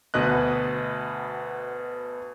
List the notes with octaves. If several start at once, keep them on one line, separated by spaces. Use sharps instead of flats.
D2 B2 B4 D#5 F#6